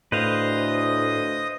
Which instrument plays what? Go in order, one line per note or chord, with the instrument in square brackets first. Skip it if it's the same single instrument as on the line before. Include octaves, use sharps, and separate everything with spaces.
[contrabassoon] D2 [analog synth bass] A2 [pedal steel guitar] B4 C5 F5 [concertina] D#5 D#6